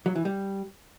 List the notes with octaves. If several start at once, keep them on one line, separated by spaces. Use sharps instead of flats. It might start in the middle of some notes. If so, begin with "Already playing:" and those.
F#3
E3
G3